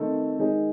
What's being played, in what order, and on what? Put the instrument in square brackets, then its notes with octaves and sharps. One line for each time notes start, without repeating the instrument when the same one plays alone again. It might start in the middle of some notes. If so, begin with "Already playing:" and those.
Already playing: [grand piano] D#3 A3 C4 D#4 A4
D#3 G#3 D#4 G#4